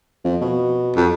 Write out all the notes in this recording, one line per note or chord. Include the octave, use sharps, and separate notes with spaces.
F2
B2
F2